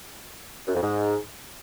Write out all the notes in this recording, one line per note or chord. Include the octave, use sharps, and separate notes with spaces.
F#2
F2
G#2